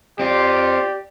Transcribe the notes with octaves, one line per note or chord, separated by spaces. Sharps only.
C4 F4 G4 D5